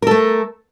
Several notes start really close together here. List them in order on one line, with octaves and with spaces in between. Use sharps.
A#4 A4 A3